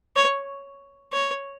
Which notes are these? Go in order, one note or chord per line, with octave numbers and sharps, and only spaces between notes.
C#5
C#5